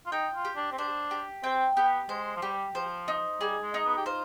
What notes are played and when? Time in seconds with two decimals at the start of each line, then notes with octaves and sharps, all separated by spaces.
0.06 F4
0.12 D#4 G5
0.34 F4
0.45 G4
0.56 D4
0.72 C4
0.78 D4 C5
1.11 G4
1.43 C4 G5
1.76 B3 G4
2.09 G#3 C5
2.36 F3
2.42 G3 G4
2.75 F3 C5
3.08 D#4
3.40 G3 G#4
3.62 G#3
3.74 D#4
3.85 B3
3.97 G4
4.06 F4 C5